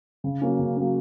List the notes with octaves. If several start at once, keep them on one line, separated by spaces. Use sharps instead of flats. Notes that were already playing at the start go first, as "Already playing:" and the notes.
C#3
F#3 A#3 C#4
C#3
F#3 A#3 C#4